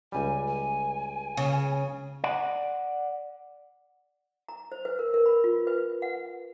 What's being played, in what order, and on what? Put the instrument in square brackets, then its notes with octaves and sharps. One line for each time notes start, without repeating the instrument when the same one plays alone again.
[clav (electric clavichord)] C#2 G3 [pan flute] G#5
[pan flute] G#5
[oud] C#3
[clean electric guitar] D5 F#5
[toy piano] A#5
C5
B4
A#4
A#4
B5
F4
B4
F#5